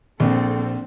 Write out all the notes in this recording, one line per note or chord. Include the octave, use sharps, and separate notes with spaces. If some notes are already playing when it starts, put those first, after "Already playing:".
A#1 C4 A4